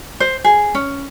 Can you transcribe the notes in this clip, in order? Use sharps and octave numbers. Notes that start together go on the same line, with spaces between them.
C5
G#4
C#4